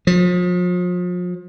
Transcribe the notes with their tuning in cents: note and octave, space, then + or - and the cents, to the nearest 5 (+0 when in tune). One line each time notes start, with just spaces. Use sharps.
F3 +40